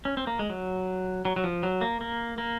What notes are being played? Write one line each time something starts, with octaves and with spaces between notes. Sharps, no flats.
C#4
C4
A#3
G#3
F#3
F#3
F#3
F3
F#3
A#3
A#3
A#3